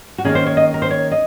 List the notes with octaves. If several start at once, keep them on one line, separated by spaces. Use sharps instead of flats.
F#4
D#3 A#3 C#4 G#4
C5
C#5
D#5
A#4
C5
C#5
D#5